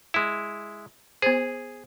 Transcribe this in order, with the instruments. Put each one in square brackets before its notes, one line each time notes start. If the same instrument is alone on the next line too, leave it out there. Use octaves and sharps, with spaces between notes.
[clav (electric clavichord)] G#3 E4
[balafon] B3 C5 [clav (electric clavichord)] G#4